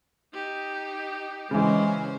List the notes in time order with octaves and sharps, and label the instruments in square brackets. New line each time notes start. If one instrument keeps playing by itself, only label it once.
[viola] D#4 G4
[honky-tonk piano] C#3 E3 [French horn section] G#3 [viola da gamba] C#4 C5